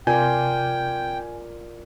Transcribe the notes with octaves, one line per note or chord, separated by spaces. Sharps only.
C3 F4 A#4 D5 G5 G#5 G6